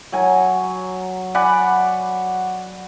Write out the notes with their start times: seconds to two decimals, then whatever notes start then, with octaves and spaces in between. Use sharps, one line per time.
0.12 F#3 G#5 A#5
1.34 D5 F#5 G#5 B5